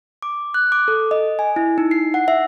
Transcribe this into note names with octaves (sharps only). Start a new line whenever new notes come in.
D6
F#6
D6
A4
D#5
G#5
E4
D#4
C7
F#5
E5